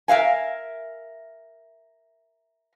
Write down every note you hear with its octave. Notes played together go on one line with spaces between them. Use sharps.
A#4 E5 F5 G#5